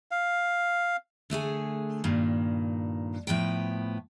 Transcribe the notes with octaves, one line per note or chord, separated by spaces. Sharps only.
F5
D3 A3 G#4 G#5
G2 A#2 D#3
A2 F3 B3 G5